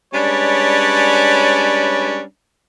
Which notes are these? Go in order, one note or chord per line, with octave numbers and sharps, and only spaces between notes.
G3 G#3 C#4 D4 B4 C#5